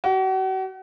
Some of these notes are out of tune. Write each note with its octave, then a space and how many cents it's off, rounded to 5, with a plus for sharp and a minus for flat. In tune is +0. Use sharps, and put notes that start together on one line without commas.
F#4 +40